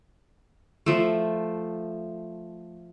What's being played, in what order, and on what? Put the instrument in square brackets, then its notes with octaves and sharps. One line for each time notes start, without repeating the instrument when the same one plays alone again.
[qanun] F3 A3